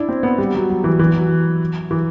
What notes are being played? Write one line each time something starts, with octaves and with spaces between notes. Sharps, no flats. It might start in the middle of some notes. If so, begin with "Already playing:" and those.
Already playing: D4 E4
C4
B3
G3
F#3
F#3
E3
E3
F#3
E3